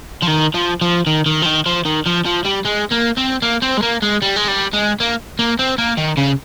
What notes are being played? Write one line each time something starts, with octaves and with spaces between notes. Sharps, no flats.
F3
D#3
F3
F3
D#3
D#3
F3
D#3
F3
D#3
F3
F3
G3
G#3
A#3
C4
A#3
C4
G#3
A#3
G#3
G3
G#3
G3
G#3
A#3
A#3
C4
A#3
D#3
C#3